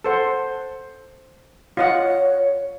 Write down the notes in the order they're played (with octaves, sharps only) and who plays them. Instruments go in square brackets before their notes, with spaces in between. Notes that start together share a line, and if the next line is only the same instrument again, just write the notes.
[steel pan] A4 C5 F#5
[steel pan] F4 D#5 F#5 [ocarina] C#5